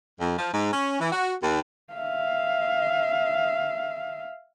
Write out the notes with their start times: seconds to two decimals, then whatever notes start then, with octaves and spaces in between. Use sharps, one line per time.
0.19 F2
0.37 F3
0.52 G#2
0.71 C#4
0.99 E3
1.12 F#4
1.41 D#2
1.94 E5 F5